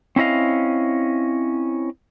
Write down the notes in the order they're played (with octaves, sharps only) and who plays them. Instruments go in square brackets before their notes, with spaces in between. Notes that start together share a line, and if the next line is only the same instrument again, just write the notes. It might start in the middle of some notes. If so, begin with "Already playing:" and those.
[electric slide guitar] C4 C#4 E4 D#5 F5